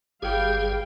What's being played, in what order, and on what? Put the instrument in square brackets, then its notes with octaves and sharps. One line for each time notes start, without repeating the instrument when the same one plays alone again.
[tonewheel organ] G1 G#4 [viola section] G3 F5 G5